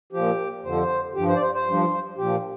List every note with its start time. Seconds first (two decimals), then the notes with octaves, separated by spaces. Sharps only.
0.13 A#2 F3 G4
0.64 F2 D3 F3 C5
1.15 G2 F3 G4
1.28 C5
1.36 D5
1.42 C5
1.55 C5
1.66 G2 F3
2.18 A#2 F3 G4